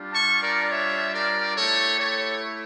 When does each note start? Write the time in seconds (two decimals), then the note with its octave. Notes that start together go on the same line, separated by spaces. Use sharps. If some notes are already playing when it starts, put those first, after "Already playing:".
Already playing: G3 D4 F4
0.14 A5 C#6
0.43 A#4 D5
0.71 C#5 E5
1.14 A#4 D5
1.57 A3 E4 G4 A4 C#5
2.00 A4 C#5